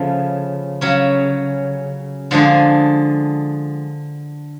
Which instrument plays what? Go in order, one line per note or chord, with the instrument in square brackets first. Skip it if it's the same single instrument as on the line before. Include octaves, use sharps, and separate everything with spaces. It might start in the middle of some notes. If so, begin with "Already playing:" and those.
Already playing: [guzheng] C#3 F3 A3
C#3 F#3 C#4
D3 F3 G#3 D4 G#4